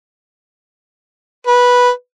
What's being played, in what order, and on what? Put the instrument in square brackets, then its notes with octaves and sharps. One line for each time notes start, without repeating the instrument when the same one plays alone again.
[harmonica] B4